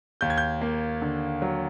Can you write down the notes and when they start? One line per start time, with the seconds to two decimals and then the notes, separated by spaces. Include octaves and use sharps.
0.21 D#2 G6
0.30 G#6
0.38 G6
0.61 A#3
1.02 D3
1.42 F#3